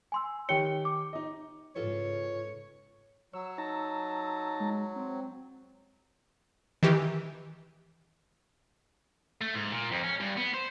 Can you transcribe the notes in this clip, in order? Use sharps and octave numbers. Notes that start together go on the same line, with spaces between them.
G#5 C6 E6
D#3 G4 C#5 G5 C#7 G7
D6
D#4 D#5
G#2 C#3 F4 A4 B4 C#5
F#3 C#5 E6
D#4 A5 A#5
G#3
C4
D#3 E3 G4
A3
G#2
A#2
F2
C#4
G2
B3
C5